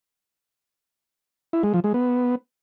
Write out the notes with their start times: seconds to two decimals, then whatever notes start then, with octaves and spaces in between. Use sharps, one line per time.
1.53 E4
1.63 G#3
1.74 F3
1.84 G#3
1.94 B3